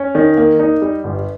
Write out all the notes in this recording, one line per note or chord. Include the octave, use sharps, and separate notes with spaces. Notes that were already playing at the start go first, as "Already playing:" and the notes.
Already playing: C#4
D#3
A#3
D#4
G3
G1